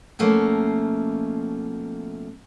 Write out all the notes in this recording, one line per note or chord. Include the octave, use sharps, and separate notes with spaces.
B2 F3 A3 A#3 C#4